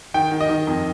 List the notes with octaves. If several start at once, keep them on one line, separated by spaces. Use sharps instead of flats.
D#3 G5
D#3
D#5
D#3
F2